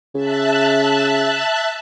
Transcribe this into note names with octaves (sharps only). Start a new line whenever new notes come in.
C#3 E5 A5 F#6